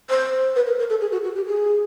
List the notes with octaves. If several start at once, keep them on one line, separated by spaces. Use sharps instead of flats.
C5
B4
A#4
A#4
A4
G#4
F#4
F#4
G4
G#4